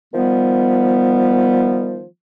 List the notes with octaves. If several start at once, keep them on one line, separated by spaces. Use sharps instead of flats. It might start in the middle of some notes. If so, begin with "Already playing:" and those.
D#3 F3 G3 B3